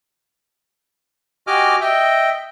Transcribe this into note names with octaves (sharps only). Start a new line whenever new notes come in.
F#4 G4 D#5 G#5 D6 F6
D#5 E5 G5